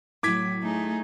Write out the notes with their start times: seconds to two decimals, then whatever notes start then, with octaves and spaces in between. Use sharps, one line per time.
0.23 A2 F#3 D6 G#6 B6
0.62 A3 D#4 G#4